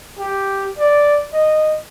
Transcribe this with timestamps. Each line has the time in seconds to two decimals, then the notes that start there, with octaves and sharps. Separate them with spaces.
0.19 G4
0.78 D5
1.33 D#5